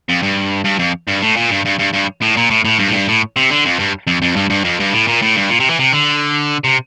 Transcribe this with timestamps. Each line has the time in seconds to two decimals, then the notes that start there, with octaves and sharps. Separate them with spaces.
0.09 F2
0.22 G2
0.65 G2
0.79 F2
1.08 G2
1.22 A2
1.37 A#2
1.51 G2
1.66 G2
1.79 G2
1.93 G2
2.22 A2
2.37 A#2
2.50 A2
2.65 A2
2.79 G2
2.88 A2
2.93 G2
3.08 A2
3.36 C3
3.50 D3
3.65 F2
3.79 G2
4.07 F2
4.22 F2
4.36 G2
4.50 G2
4.64 F2
4.80 G2
4.93 A2
5.07 A#2
5.22 A2
5.36 G2
5.50 A#2
5.60 C3
5.69 E3
5.79 C3
5.92 D3
6.64 C3